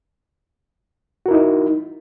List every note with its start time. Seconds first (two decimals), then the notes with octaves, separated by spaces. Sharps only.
1.26 F#4
1.28 A#4
1.31 E4
1.34 D#4